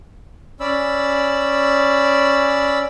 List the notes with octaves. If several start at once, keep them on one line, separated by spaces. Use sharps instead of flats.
C#4 D5 B5 E6